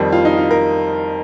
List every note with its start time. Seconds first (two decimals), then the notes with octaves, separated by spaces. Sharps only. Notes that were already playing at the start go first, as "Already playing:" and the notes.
Already playing: F2 D#3 G3
0.12 F4
0.25 D#4
0.37 F4
0.51 A#4